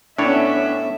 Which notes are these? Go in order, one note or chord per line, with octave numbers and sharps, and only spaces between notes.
A2 B3 C#4 D4 C#5 E5